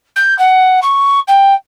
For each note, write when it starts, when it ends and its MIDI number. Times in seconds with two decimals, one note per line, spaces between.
0.16 0.37 91
0.39 0.80 78
0.82 1.20 85
1.28 1.54 79